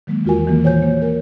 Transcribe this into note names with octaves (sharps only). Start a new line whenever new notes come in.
D#3 F#3 G#3 A#3
E2 E3 F4 F#4 A#4 G#5
D#3 E3 F#3 A#3
A#2 C5 C#5 G#5 G6
A#3
A#4